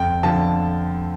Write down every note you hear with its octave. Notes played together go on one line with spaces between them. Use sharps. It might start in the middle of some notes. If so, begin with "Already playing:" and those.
Already playing: F2 G5
D3 F3 A5